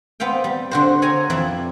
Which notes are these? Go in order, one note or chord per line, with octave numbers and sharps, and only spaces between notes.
B3 C4 F5 G5
G3
D3 F#4 C5
C4 C#5 G#5 A#5
F2 E3 E4 D5